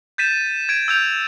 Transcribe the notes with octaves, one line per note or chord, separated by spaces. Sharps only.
G6 A6 B6 D#7 E7
G#6 D7
E6 G6 F7